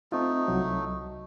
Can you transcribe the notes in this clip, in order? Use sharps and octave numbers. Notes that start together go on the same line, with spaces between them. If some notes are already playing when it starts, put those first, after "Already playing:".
A3 C4 D#4 F4
C2 F#3